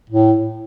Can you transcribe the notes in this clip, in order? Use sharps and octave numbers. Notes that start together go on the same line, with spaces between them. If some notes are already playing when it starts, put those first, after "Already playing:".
A2